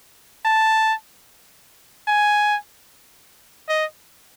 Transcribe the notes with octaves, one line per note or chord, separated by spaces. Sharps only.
A5
G#5
D#5